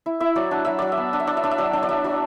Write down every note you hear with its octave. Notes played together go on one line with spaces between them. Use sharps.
E4
E4 E5
F#3 D5
D4 F#5
F#3 E5
F#3 D5
E5
B3
D4
E5
D4 D5
E5
D4 D5
E5
F#3 D5
D4
D5
F#3 E5
F#3